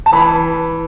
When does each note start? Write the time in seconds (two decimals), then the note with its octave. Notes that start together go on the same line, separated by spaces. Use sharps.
0.06 A5
0.13 E3 B5